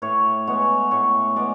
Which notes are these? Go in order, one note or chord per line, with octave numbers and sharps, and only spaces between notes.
A2 C#5
G#3 B3 C#5
A2 C#5
G#3 B3 D5